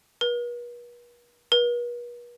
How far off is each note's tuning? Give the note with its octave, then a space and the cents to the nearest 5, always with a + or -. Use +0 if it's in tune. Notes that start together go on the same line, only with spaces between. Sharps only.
B4 -45
B4 -45